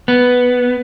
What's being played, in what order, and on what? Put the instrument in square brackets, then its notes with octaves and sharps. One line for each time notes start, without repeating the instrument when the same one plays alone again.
[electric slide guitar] B3